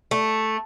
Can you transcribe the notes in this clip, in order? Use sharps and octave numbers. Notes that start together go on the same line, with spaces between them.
A3